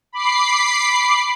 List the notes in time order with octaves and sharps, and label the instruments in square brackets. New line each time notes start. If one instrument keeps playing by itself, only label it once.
[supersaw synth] B5 D6 C7